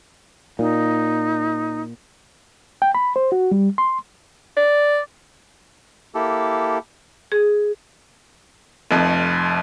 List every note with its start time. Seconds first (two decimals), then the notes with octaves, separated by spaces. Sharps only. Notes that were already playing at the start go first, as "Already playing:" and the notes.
0.59 A#2 D#4
2.82 G5
2.95 B5
3.16 C5
3.32 F#4
3.51 G3
3.78 C6
4.57 D5
6.15 A#3 E4 G4 A4
7.32 G#4
8.91 F1 F2